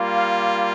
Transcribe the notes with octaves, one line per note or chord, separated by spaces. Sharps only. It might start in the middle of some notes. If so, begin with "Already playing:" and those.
Already playing: G3 A#3 F4
F5